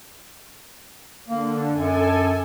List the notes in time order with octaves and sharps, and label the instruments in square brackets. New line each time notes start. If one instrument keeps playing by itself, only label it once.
[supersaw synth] D3 [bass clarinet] A#3
[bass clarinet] F#2 [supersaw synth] A4 G#5